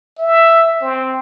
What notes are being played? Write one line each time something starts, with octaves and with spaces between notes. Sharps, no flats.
E5
C4